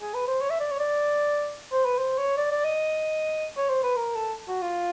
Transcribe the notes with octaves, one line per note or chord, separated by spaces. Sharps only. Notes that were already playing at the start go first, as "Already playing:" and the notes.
G#4
B4
C5
C#5
E5
D5
C#5
D5
C5
B4
C5
C#5
D5
D5
D#5
C#5
C5
B4
A#4
A4
F#4
F4